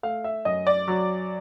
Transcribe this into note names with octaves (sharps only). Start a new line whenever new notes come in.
A3 F5
E5
F#2 D#5
D5
F#3